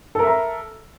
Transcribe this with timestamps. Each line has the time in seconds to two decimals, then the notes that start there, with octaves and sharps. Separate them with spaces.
0.15 A4
0.19 A#4
0.23 E5
0.27 A#5